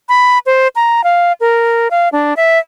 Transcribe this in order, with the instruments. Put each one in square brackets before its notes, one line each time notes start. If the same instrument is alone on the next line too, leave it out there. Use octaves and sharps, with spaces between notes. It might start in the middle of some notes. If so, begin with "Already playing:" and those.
[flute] B5
C5
A#5
F5
A#4
F5
D4
E5